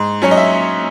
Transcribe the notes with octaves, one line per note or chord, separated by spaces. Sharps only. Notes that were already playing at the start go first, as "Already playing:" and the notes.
Already playing: G#2
F#3 C#4 C#5
D#5
E5